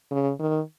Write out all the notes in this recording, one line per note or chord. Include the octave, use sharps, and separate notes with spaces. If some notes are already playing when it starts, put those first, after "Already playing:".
C#3
D#3